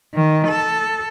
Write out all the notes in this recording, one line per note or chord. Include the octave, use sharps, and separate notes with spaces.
D#3
A4